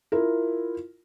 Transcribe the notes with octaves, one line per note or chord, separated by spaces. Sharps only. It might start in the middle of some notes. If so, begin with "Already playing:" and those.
E4 F4 A#4